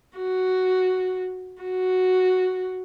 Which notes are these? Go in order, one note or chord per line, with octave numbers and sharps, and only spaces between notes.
F#4
F#4